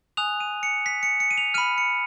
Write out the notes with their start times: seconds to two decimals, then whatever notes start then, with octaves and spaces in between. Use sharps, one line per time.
0.17 G#5 D#6 F#6 F7
0.40 D#7
0.63 C#7
0.86 B6
1.03 C#7
1.20 C#7
1.31 D#7
1.38 F7
1.54 B5 F6 D#7
1.78 C#7